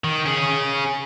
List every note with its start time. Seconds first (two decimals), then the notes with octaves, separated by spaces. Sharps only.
0.04 D#3
0.26 C#4 G#4